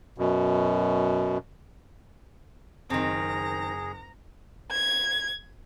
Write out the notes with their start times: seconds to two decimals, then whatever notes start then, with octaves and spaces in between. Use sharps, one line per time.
0.18 F#2 B2
2.90 F#1 D#3 C4 G#4 A#5
4.70 G#6